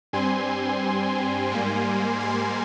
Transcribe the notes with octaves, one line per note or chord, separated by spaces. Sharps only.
G2 G3 C4 G#5 C6
G#2 G3 A#3
G#5 C6